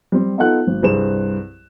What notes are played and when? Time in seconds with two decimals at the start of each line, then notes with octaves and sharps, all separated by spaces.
0.12 G3 C4
0.38 B3 D#4 F4 A4 F#5 F#6
0.67 G#1
0.82 C2 G2 G#4 C5 E7